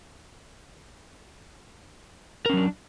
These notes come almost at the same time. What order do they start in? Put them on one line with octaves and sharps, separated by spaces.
A#4 C#4 F#3 D4